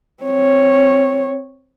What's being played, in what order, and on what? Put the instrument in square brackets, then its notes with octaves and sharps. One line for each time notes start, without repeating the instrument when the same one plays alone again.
[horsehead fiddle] C4 C#5